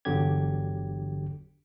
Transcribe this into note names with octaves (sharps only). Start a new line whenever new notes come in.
G1 E2 D3 F#3 G4 G#6